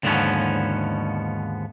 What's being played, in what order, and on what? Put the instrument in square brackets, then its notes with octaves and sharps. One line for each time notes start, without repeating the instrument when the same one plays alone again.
[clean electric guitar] D#2 G#2 D3 F3 B3 C#4